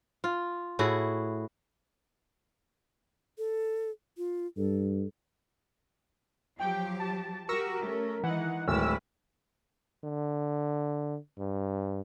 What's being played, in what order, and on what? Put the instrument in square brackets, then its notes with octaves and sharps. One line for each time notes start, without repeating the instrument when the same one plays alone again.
[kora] F4
A2 E4 F#4 G#4
[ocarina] A4
F4
[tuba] G2 [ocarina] A4
[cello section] F3 F#3 G4 [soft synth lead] G5
[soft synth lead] A5
[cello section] F#4 G4 [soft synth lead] A#4 [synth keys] C#6 E6 A#6
[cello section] A3 C#4
[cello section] D#3 G#3 D#4 [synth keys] E3 [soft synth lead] F#5
[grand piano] D1 [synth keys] D#3 [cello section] G#3 E4 B4 [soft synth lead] E6
[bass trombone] D3
G2